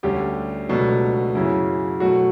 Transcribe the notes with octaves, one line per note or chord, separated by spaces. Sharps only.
D2 D3 G3 C#4 G4
C#2 B2 F#3 A3 D4
F#2 C#3 F#3 C#4 E4
B2 F#3 A3 F#4